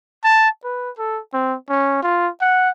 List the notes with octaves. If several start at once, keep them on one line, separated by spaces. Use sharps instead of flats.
A5
B4
A4
C4
C#4
F4
F#5